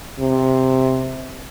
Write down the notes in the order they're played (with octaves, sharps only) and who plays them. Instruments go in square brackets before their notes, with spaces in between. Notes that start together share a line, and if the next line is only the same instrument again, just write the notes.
[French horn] C3